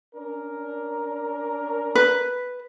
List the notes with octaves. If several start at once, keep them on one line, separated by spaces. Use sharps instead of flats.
C#4 D4 A#4
B4